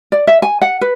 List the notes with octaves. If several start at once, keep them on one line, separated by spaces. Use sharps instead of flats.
D5
E5
G#5
F#5
B4